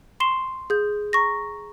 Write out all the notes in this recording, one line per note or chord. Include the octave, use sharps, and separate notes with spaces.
C6 C#6 C7 E7 G7
G#4 G6
A#5 C#6 A#6